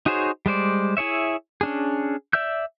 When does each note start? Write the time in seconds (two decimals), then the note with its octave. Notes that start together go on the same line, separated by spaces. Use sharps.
0.06 D#4 F#4 G#4 C5 C#5
0.46 G3 G#3 C5 D5
0.97 E4 G#4 C#5 E5
1.61 C#4 D4 G#4
2.33 D5 E5 E6 G6